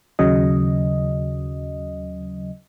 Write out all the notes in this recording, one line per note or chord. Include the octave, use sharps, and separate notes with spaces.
D#2 C#3 F#3 D#5